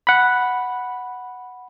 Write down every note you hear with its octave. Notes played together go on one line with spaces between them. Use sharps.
F#5 B5